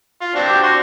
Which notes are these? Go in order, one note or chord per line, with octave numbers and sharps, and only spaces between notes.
F4
C4 D4 F#4
G4
F#4 C6